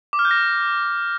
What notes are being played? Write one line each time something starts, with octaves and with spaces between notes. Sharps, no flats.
D6
F6
G6
A#6